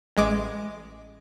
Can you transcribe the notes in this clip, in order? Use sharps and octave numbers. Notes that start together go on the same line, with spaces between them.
A1 G#3 D6